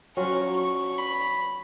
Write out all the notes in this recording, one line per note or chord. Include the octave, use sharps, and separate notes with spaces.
F#3 C#4 F4 C#6
C#6
B5